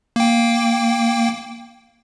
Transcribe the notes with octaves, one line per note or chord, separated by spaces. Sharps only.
A#3 G5